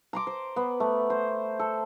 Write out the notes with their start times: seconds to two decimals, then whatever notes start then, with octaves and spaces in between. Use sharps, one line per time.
0.13 A#5 C6 D6
0.27 C5
0.56 B3
0.80 A3
1.10 C5
1.59 A4